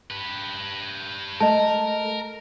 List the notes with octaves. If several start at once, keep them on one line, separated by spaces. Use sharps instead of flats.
G4 B4
A3 A#4 D#5 A5